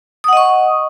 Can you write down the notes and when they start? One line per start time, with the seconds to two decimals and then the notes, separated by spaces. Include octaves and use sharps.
0.24 D#6
0.28 F#5
0.33 D#5
0.37 C#6